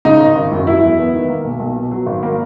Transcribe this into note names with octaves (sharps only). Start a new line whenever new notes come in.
C#3 D#4
G#1
G#1
F#2
F#3 E4
E2
B3
D#3
A#3
B1
B1
B2
F#3
G#1
A#3